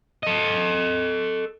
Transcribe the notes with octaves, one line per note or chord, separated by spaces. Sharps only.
A4 D#5